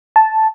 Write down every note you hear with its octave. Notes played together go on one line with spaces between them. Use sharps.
A5